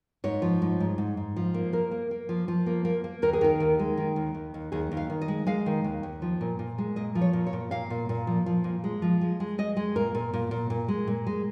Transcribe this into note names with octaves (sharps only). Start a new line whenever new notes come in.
G#2 C#5
F3
G#2
G#2
G#2
G#2
F3
A#3
A#3 A#4
A#3
A#3
F3
F3
A#3
A#3
A#3
D#2 A#4
G#4
D#3 A#4
D#2
G#3
D#3
D#2
D#2
D#2
D#2 G#4
D#2
F5
D#3
D#5
G#3
G#3 F5
D#3
D#2
D#2
F3
A#2
A#2
G#3
A#2 D#5
F3
C#5
A#2
C#5
A#2
A#2 F5
A#2
A#2
F3
F3
A#2
G#3
F3
G#3
G#3
G#3 D#5
G#3
A#2 A#4
A#2
A#2
A#2
A#2
G#3
A#2
G#3